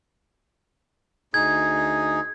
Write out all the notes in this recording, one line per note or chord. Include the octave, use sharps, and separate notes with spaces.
D2 D#4 G#4 G#6